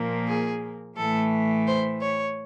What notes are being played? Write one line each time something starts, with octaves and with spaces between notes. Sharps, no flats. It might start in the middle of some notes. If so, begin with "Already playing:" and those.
Already playing: A#2 F3 A#3
G#4
A2 E3 A3 A4
C5
C#5